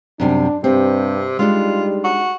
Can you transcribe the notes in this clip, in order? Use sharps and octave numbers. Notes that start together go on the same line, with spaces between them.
F#2 C3 G3 D4
G2 C3 C4
G3 G#3 D4 D#4 F4
F#4